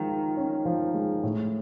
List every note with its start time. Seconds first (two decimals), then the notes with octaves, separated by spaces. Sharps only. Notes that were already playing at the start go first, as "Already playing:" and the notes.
Already playing: D#3 F3 G#3
0.09 F4
0.37 C#4
0.65 F3
0.94 G#3
1.23 A2